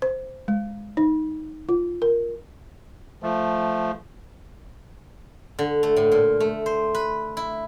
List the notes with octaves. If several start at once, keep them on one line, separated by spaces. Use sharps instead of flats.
C5
G#3
D#4
F4
A#4
F3 A3
D3
A3
A2
A#2
A3
C5
B4
E4